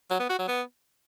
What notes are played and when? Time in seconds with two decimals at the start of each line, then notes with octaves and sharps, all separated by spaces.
0.10 F#3
0.20 B3
0.29 F#4
0.39 F#3
0.48 B3